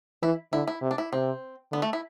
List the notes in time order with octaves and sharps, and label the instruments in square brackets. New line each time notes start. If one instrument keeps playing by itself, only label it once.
[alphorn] E3 [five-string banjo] E4
[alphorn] D3 [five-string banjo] E4
[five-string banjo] E4
[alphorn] C3
[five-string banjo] D4
E4
[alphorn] C3 [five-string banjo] C4
[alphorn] D3 [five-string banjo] B3
[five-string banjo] A3
E4